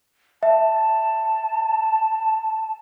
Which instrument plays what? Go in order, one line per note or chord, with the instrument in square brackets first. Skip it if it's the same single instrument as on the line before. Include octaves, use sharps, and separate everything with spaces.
[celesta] E5 [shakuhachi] A5